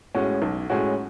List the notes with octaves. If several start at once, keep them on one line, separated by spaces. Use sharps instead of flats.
A2 G#3 C#4 F#4
B1
A2 G#3 C#4 F#4